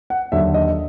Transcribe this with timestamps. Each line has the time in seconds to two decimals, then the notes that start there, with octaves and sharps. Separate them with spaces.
0.10 F#5
0.32 D#2 D3 F#3 E5
0.54 D#5